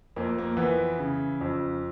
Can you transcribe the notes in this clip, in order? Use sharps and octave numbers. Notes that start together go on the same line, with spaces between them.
F2 A#3
A#3
E3 B3
C#3
F2